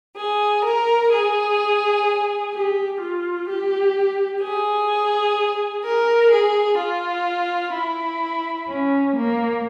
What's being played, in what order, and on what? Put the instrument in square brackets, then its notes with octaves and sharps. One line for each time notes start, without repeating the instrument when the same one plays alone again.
[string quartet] G#4
A#4
G#4
G4
F4
G4
G#4
A#4
G#4
F4
E4
C#4
A#3